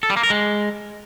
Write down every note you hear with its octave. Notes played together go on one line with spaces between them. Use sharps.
A4
G3
A#3
A#4
G#3